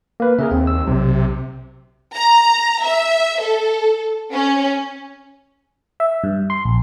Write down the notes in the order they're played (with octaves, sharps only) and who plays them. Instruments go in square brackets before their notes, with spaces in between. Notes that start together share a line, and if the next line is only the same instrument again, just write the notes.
[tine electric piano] A#3 B4
[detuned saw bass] C#3 [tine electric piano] G#4 A#4 E5
[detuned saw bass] D#2 [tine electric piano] C4
[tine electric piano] E6
[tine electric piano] B1 [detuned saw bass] C3
[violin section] A#5
E5
A4
C#4
[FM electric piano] E5
G2
C6
A#1